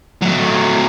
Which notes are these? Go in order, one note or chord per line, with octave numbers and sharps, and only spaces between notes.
F#3 A3